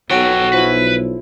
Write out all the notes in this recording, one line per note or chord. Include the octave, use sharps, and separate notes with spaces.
B1 F#3 F#4 A4 G5
F3 E4 B4